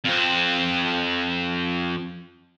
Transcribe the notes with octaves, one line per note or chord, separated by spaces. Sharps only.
F2 C4